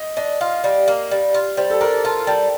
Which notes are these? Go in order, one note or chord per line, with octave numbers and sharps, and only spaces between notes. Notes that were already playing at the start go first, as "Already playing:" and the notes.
Already playing: D#5
D4 D#5
F4 F5
G3
A#3
G3
F4
G3 C5
A4
D4 A#4
F4 A5
G3 A5